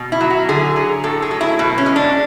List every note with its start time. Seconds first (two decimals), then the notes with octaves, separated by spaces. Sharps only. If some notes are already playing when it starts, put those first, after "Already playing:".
Already playing: B2
0.12 E4
0.21 F#3
0.30 F#4
0.49 D3 G#4
0.76 F#3
1.04 A2 A4
1.22 G#4
1.31 F#3
1.41 E4
1.59 B2
1.78 C#4
1.86 G#3
1.96 D4